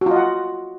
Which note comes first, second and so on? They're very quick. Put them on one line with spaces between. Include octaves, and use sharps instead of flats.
F#4 F4 D#5 F#5